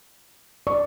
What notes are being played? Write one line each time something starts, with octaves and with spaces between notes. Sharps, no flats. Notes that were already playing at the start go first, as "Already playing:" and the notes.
D5 C#6